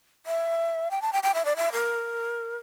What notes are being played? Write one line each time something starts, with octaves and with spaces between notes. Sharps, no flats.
E5
G5
A5
G5
G5
E5
D5
E5
A#4